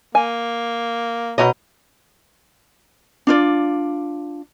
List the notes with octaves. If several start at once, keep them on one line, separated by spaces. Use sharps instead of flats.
A#3 G#5
B2 D#4 C#5 D#5
D4 F4 D5